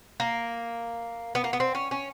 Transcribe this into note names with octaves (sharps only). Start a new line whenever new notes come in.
A#3
B3
A#3
B3
C4
C#4
C#4